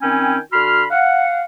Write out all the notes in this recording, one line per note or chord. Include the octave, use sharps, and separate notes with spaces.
D#3 C4 C#4 G5 G#5 B5
D3 F#4 B5 C6 F6
F5 F#5